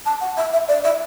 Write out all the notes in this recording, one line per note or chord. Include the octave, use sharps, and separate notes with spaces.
A5
F#5
E5
E5
D5
E5